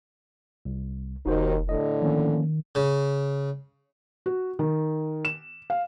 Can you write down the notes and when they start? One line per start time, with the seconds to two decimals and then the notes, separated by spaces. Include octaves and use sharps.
0.65 C2
1.26 F1 D#2 D#3 D#4 F#4 C5
1.69 A2 D3 D#5
2.02 D#3 F3 A#3 C#4
2.75 C#3
4.26 F#4
4.59 D#3
5.25 E7
5.70 F5